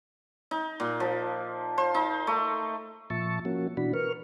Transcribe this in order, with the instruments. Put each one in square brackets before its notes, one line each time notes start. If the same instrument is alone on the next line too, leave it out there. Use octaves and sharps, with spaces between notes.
[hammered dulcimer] D#4
A#2
F3
C5
D#4
A3
[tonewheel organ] A#2 F3 E5 A5 C#6
F3 A#3 C#4 F#4
B2 E3 D4 F#4 B5
A#4 B4 C#6 F6